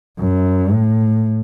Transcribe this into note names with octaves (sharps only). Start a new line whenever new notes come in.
F#2
A2